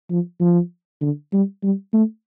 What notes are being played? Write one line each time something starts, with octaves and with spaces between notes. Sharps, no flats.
F3
F3
D3
G3
G3
A3